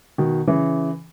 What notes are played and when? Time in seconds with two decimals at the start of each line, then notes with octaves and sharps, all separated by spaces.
0.18 B2 D#3
0.48 C#3 E3